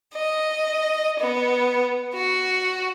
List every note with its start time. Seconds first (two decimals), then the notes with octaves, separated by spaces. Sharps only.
0.14 D#5
1.19 B3
2.14 F#4